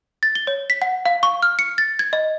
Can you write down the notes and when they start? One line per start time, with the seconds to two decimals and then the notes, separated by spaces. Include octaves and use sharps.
0.23 A6
0.35 G7
0.47 C#5
0.70 B6
0.82 F#5
1.06 F5
1.23 C#6
1.42 F6
1.59 C#7
1.78 A6
1.99 G#6
2.13 D#5